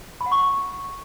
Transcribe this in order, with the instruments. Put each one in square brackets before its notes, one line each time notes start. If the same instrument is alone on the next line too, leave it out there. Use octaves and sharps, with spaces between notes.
[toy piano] B5
F#5
C#6